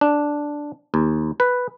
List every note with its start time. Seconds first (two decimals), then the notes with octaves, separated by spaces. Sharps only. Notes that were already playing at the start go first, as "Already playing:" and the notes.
0.01 D4
0.94 D#2
1.40 B4